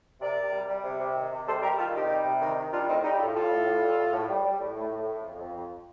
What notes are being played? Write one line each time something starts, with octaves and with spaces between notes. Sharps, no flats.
C3 A#4 D5
C3
G3
G3
C3
C3
D#3
C3
G3 A4 C5
G3 G4 A#4
D#3 F4 A4
C3 D#4 G4
G3
C3
D#3
D#3
G3 D4 F4
A2 C4 D#4
G3 D#4 G4
A2 F4 A4
G3 F4 A4
A2
A2
G3
A2
A2
G3
G3
A2
A2
A2
A2
F2
F2
F2